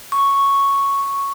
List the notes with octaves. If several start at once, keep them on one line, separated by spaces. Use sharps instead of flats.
C#6